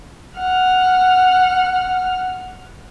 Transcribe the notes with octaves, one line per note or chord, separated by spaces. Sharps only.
F#5 F6